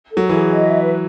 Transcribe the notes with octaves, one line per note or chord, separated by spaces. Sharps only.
A4
F#3
E3 G#4
D#5
E5
B4